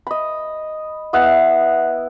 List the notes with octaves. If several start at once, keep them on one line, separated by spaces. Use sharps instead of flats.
D#5 B5
B3 E4 D#5 F#5